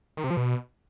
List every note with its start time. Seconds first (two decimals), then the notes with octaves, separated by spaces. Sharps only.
0.17 D#3
0.24 C3
0.30 F3
0.37 B2